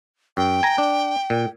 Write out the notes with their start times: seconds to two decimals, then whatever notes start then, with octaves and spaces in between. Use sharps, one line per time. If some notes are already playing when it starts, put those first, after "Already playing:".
0.37 F#2 G5
0.63 G#5 A#5
0.78 D4
1.30 A#2